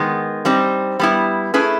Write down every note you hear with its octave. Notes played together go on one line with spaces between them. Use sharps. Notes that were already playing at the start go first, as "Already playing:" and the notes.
Already playing: D#3 G#3 B3
G3 C4 D#4
G3 B3 E4
A3 C#4 E4 G#4 B4